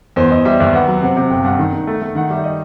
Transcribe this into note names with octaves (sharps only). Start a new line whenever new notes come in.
E2 C5
E2 D#5
G3 E5
D#2 E5
B3 F#5
F#3
C3 F#5
C3
G1 G5
G2 F#5
D#3
D#3
A3
A3
D#3 F#5
G3 E5
D#5